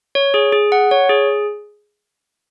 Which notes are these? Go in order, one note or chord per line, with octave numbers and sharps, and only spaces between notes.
C#5
G#4
G#4
F#5
C#5
G#4